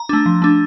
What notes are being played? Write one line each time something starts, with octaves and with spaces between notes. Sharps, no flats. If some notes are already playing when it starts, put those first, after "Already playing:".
Already playing: A#5
A3 D4
F3
A3 D4